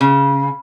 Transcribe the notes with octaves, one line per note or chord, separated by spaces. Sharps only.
C#3